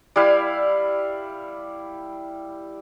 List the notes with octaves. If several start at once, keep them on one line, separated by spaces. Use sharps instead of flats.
G3 E4 F5